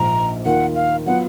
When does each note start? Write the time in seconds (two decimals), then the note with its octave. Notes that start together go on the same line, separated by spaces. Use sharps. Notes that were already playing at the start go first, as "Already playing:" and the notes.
Already playing: A#1 G#2 F3 A#5
0.45 D#2 D#3 A#3 F4 F#5
0.75 F5
1.06 F#3 B3 F4 F#5